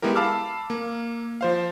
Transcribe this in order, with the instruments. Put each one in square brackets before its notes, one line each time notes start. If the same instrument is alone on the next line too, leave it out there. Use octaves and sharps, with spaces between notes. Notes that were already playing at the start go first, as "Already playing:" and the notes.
[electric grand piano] G#3 B3 E4 G4 A#4
F5 A5 B5 D6 E6 F6
A#3
F3 C5 F5